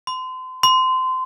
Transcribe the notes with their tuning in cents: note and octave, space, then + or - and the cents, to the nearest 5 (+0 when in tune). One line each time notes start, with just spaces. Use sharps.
C6 -35
C6 -25